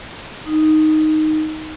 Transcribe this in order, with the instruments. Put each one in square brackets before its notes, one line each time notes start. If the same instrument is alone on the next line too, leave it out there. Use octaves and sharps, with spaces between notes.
[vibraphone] D#4